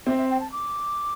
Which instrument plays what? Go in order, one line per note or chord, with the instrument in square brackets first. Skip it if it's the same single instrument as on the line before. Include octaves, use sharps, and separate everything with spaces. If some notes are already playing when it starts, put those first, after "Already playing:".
[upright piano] C4 [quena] E5
[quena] E5
G5
A5
D6